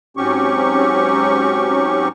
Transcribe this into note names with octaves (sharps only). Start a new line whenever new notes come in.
G#2 F#3 C4 C#4 G4 C#6